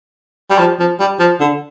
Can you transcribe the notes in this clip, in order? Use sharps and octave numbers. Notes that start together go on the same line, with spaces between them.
G3
F3
F3
G3
F3
D3